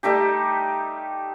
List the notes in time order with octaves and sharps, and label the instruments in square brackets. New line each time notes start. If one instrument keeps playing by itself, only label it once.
[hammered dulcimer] G3 A3 D#4 G4